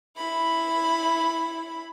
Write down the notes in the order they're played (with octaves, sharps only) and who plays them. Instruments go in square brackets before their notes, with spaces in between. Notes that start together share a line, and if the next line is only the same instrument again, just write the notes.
[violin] E4 B5